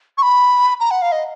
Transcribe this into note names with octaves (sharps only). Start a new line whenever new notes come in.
C#6
B5
A#5
F#5
F5
D#5